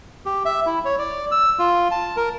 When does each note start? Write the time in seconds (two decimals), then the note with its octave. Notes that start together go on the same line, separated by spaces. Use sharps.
0.26 G4
0.45 E5
0.66 E4
0.85 C#5
0.98 D5
1.31 E6
1.59 F4
1.91 A5
2.17 A#4